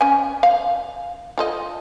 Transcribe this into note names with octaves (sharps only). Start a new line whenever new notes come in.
C#4 G#5
F5
F4 A4 D#5